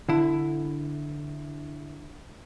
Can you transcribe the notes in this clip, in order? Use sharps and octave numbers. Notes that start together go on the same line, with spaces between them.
D3 E4